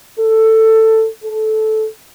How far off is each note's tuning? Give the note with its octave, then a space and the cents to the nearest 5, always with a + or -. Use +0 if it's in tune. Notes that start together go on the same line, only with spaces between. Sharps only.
A4 +15
A4 -15